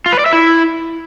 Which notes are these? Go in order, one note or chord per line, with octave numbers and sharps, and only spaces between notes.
F4
B4
D5
E5
E4